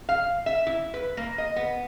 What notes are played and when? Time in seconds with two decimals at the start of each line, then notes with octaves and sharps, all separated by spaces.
0.09 F5
0.46 E5
0.67 E4
0.94 B4
1.17 A#3
1.38 D#5
1.56 B3